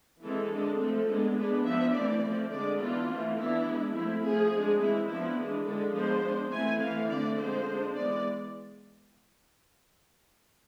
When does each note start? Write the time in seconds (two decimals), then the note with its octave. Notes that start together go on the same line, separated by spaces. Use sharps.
0.22 E3 G#3 C4 A4
0.51 D3 G#3 D4
0.79 F3 A3 C4 A4
1.08 G#3 B3 D4
1.37 G#3 B3 D4 B4
1.65 F3 B3 D4 E5
1.93 E3 A3 C4 D5
2.22 F3 A3 C4
2.51 D3 G#3 D4 D5
2.80 E3 B3 D4 F4
3.08 E3 A3 C4
3.37 E3 B3 D4 E4
3.66 G#3 B3 D4
3.94 F3 A3 C4 E4
4.22 F3 A3 C4 G#4
4.52 G#3 D4
4.80 E3 G#3 C4 E4
5.08 F3 B3 D4 E4
5.37 E3 G#3 D4
5.66 D3 G#3 D4 A4
5.94 F3 G#3 B3 D4 C5
6.23 G#3 D4
6.52 E3 A3 C4 G#5
6.80 E3 A3 C4 F5
7.08 D3 A3 C4 D5
7.37 D3 F3 G#3 C4 C5
7.65 G#3 D4
7.94 E3 G#3 B3 D5